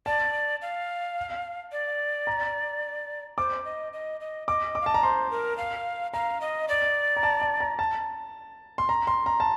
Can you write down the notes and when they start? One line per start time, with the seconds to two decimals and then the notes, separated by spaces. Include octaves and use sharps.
0.06 D5 A5
0.62 F5
1.72 D5
2.27 A#5
3.38 C5 D6
3.65 D#5
3.93 D#5
4.20 D#5
4.48 D#5 D6
4.75 D6
4.81 F5
4.86 D#5 A5
4.94 D5 A#5
5.03 C5 C6
5.31 A#4
5.58 F5
6.14 F5 A#5
6.41 D#5
6.68 D5
7.17 A#5
7.23 A5
7.42 A5
7.60 A#5
7.79 A5
8.78 C6
8.89 A#5
9.07 C6
9.26 A#5
9.40 A5